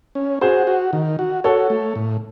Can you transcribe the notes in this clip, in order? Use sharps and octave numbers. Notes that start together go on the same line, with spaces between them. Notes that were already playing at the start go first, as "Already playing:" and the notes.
C#4
F#4 G#4 C5
F#4
D#3
F#4
F#4 A4 C#5
A3
A2